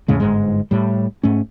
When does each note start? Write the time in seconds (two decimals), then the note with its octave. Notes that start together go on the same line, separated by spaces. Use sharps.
0.08 E2 A2 C#3 G#3
0.20 G1 G#2 G#3
0.71 A2 G3
1.23 G#2 A3 C#4